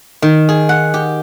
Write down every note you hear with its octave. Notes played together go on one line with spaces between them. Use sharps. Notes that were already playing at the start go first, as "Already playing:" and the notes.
D#3
G#4
F#5
G4